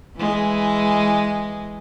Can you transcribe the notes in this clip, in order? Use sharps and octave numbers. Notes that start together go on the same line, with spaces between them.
E3 G#3